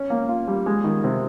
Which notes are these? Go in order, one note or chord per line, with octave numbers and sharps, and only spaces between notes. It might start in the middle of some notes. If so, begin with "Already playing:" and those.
Already playing: C#4
A#3
F4
G3
G#3
D#3
C3